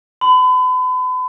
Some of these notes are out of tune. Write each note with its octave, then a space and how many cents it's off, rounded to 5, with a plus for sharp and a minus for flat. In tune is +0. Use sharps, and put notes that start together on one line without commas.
B5 +40